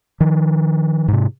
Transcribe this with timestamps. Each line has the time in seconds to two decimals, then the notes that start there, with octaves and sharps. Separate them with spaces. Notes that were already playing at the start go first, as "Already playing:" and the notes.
0.20 D#3 F3
1.08 G#2 C3